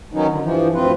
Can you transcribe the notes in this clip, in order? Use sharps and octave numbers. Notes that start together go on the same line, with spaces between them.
D#3 F#3 B3 C#4 D#4
D3
G2 E3 F3
D2 G2 C4 F4 B4